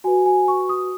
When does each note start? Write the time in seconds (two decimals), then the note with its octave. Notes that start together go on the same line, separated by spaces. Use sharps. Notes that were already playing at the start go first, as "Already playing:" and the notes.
0.04 F#4 B4 G#5
0.26 G#5
0.48 C#6
0.69 D#6